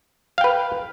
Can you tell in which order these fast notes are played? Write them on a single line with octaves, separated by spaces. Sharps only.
F5 G5 B4